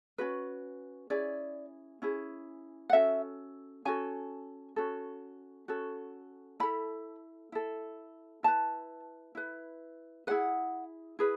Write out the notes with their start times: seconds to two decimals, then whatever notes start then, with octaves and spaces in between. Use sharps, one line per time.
0.18 C#4 F#4 B4
1.10 C#4 E4 G#4 D5
2.02 C#4 E4 G#4
2.90 F#5
2.93 C#4 F#4 A4 E5
3.85 C#4 F#4 A4 G#5
4.76 C#4 F#4 A4
5.68 C#4 F#4 A4
6.60 E4 A4 B5
7.52 E4 A4
8.43 E4 B4 A5
9.35 E4 B4
10.27 E4 G#4 B4 F#5
11.19 E4 G#4 B4